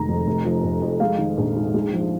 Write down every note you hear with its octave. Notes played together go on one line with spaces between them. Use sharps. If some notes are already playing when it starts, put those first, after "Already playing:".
Already playing: F1 D#3 G#3 A#5
F2
F1
F3
F1
F2
G#3 F5
D#3
A#1
G#2
G#3
F3